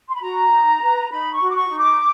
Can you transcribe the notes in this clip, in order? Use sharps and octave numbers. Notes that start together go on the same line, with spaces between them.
C6
B5
F#4 A#5
D#4
B4
D#4 B5
C#6
F#4
D6
C#6
D#4
D6